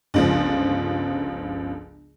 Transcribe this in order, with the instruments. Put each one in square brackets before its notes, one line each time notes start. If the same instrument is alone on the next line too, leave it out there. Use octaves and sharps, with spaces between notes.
[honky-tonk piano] G1 C#2 F3